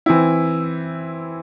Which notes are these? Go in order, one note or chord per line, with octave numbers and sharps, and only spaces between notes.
E3 C4 E4